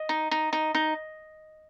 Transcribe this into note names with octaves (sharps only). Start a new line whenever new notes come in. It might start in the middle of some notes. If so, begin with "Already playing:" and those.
Already playing: D#5
D#4
D#4
D#4
D#4